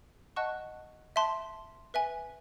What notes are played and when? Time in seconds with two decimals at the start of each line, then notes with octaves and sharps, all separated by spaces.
0.36 D#5 F#5 A5 C#6 F#6
1.16 E5 A5 C6
1.94 B4 E5 G#5